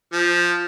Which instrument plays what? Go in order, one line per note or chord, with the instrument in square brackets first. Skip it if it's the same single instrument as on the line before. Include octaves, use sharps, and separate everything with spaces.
[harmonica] F3